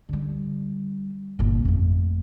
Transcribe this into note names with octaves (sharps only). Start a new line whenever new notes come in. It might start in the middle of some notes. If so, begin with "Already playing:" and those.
D3 G3
G1 A#2
F2 A3